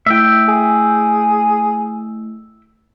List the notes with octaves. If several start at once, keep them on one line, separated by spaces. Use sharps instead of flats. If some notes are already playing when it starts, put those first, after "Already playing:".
A3 E4 E5 G5
G#4